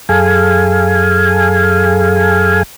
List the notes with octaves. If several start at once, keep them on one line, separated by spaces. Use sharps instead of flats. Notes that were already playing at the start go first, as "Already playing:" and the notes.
F#2 G#4 A4 F5 G#5